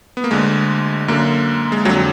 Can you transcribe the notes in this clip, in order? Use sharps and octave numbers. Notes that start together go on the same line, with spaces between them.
B3
A#3
D2 D3 G#3
F#2 D3 A#3
G#3
F2 D3 F#3
F#3